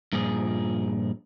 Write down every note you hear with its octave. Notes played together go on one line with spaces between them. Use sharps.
G2 A#2 F3 G#4